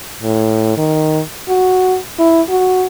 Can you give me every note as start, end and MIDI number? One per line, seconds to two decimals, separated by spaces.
0.23 0.77 45
0.77 1.20 51
1.49 1.96 66
2.19 2.42 64
2.49 2.86 66